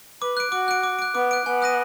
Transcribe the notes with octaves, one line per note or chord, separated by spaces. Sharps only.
B4 D6
F#6 D7
F#4 D6
F#6 D7
D6
F#6 D7
B3 D6
F#6 D7
B3 G#5
D#6 F#6 A#6 D#7